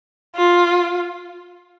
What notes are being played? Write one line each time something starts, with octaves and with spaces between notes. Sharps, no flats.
F4